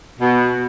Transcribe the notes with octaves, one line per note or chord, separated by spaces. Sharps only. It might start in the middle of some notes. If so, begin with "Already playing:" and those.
B2